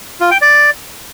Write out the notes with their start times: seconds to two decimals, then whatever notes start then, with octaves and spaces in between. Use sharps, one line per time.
0.20 F4
0.31 G5
0.42 D5